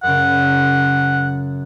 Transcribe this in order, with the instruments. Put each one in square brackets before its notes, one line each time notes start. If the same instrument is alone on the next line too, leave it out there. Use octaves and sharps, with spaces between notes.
[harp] F#2 C#3 [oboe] F#5